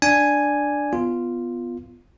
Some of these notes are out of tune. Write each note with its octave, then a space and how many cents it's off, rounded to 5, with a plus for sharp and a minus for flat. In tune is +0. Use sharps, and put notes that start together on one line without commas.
D4 +0 D5 +0 G#5 +0
B3 +10 F4 -5